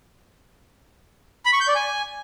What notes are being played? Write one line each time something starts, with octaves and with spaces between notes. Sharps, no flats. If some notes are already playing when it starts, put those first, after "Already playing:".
B5
C#6
G6
D5
G#5